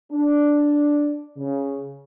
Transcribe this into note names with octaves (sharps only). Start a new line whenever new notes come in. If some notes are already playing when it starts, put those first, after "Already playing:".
D4
C#3